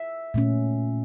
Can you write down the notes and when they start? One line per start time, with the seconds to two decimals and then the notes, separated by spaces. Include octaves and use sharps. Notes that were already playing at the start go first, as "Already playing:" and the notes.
Already playing: E5
0.34 A#2 A3 C#4